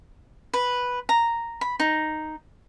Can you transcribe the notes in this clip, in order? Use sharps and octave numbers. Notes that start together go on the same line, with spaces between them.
B4
A#5
B5
D#4